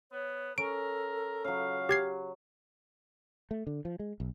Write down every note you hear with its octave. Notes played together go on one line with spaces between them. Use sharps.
B3 C#5
C#4 A4 A#4 D7
C#3 F#3 F5
G4 G#6 C7
A3
D3
F3
G#3
B1